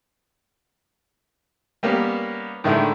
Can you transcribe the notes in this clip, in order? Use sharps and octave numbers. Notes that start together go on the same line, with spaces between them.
G3 A#3 B3 C#4
A2 D3 D#3 G#3 E4